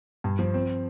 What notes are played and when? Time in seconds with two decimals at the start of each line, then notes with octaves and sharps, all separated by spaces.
0.24 G2
0.39 F3
0.54 C4